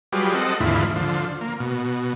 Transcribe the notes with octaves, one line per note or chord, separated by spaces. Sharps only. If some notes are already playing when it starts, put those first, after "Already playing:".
F#3 G3 F4 G4 G#4 B4
C4 A4 D#5 F#5
D#2 G#2 D3 E3 E4 F4
D3 F3
A#3
B2